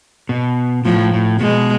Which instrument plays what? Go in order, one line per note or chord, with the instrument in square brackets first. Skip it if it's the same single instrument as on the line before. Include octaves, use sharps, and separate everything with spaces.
[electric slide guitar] B2
[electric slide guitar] A2 [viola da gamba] F3
[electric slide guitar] A2
[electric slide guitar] B2 [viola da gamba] G#3